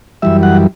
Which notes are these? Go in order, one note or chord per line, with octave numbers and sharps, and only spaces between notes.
F#2 E3 G3 E5
F#5